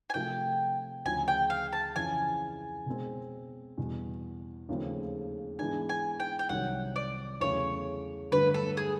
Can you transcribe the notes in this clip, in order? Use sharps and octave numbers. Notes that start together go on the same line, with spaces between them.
G#5
C3 F3 A3 G5
D2 C#3 F3 G#5
G5
F5
A5
F2 C#3 E3 G#5
B2 G#3 C4
E2 B2 G3
D#2 C#3 F3 A3 C4
G#2 E3 G#3 B3 D4 G#5
G#5
G5
G5
C2 C3 D#3 F#3 F#5
D5
E2 C#3 F#3 A3 C#5
G2 D3 F#3 A3 B4
A4
G#4